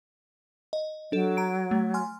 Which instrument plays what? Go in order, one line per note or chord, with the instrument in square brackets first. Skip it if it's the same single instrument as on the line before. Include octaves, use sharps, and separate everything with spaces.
[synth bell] D#5
[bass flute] F#3 [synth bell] D4 A4
[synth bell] A#5 D7
A3
G#5 C6 F6